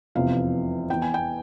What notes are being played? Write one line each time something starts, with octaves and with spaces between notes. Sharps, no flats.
F1 E2 C3 F3 F5
E2 E3 G5
G#5
G5